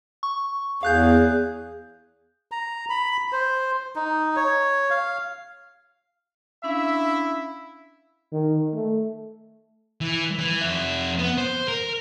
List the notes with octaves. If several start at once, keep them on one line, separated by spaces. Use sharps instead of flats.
C#6
E2 G#4 F5 F#6 G6
A#5
B5
C5
D#4
C#5
F5
C#4 D4 E4 E5 F5
D#3
A3
E3
E3
F2 E5
B3
C5
A#4